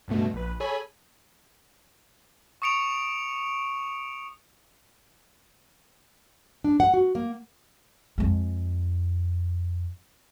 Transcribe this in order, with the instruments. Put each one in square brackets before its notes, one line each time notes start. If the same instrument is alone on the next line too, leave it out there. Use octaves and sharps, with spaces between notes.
[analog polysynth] C#2 G2 B2 A3
A#1 B4
G#4 A4 C#5 G#5 B5
[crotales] C#6 D#6 C#7 D7 F7
[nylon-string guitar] D4
F#5
F#4
A#3
[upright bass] F2 G#3